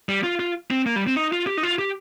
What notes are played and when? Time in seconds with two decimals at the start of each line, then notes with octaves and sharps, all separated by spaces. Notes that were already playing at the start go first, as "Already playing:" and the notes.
0.09 G3
0.23 F4
0.39 F4
0.71 C4
0.86 A#3
0.96 G3
1.07 C4
1.16 D#4
1.33 F4
1.47 G4
1.57 D#4
1.63 F4
1.79 G4